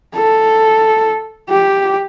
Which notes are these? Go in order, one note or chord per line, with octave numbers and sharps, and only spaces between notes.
A4
G4